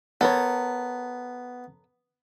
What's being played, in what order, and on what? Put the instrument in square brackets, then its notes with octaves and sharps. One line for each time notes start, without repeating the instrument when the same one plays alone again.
[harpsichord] B3 [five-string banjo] A4 A#4 C#5